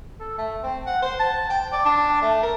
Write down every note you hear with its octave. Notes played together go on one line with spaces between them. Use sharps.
A4
A3
C4
F#5
C5
A5
G5
D5
D4
A3
A#4